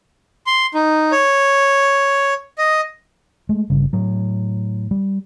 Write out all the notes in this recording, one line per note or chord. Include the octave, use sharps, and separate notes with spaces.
C6
D#4
C#5
D#5
G#3 A3
G1 C#3 G3
A2 F#3
G3